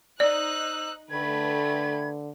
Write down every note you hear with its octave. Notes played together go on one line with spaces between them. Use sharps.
D#4 C5 D5 D#6 E6 F#6
D3 A3 B4 G5 B5 G#6